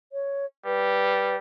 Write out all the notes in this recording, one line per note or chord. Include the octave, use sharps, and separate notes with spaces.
C#5
G3 B4